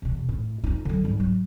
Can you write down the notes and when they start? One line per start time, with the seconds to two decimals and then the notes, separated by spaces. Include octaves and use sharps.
0.02 E2 B2
0.29 A2
0.64 F2 D#4
0.85 D3 F#3
1.04 G#2 G3
1.20 F#3